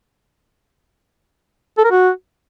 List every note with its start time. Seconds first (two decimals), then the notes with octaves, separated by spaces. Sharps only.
1.78 A4
1.84 A#4
1.91 F#4